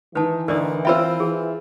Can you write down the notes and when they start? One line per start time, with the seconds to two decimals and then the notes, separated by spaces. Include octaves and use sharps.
0.15 D#3 E3 B4 A5
0.48 D2 D#4 A#4 D5 D#6
0.85 C4 E4 F4 E5 G5 B5 E6
1.20 E3 G#4